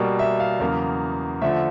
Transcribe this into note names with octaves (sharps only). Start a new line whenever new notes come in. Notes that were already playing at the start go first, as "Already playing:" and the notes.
Already playing: B2 G3 A#3
E5
F5
E2 C#3 F#3 A#3
D3 F3 A3 E5